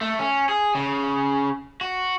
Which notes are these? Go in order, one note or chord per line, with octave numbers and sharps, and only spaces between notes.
A3
C#4
G#4
C#3
F#4